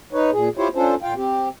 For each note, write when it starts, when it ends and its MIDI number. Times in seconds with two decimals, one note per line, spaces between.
0.13 0.31 63
0.13 0.31 71
0.13 0.31 73
0.33 0.49 46
0.33 0.49 68
0.57 0.68 64
0.57 0.68 65
0.57 0.68 67
0.57 0.68 72
0.57 0.68 73
0.75 0.95 61
0.75 0.95 62
0.75 0.95 65
0.75 0.95 69
0.75 0.95 72
1.02 1.14 46
1.02 1.14 65
1.02 1.14 77
1.02 1.14 79
1.16 1.49 60
1.16 1.49 67